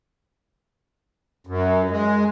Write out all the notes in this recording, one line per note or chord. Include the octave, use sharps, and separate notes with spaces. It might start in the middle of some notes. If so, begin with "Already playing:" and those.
F#2
G#3